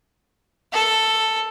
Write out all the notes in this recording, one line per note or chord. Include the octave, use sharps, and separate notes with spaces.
A4